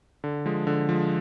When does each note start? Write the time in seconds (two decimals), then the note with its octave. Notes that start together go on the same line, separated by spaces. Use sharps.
0.24 D3
0.46 F3 G#3
0.67 D3
0.89 F3 G#3